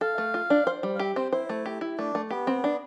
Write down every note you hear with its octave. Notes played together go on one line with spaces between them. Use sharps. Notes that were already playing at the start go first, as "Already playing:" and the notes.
A4 F5
A3
F4
D4
C5
G3
F5
G4 E5
C4 C5
E4 C5
A3
G4
E4
A3 D4
A3
B3 G4
C4
D4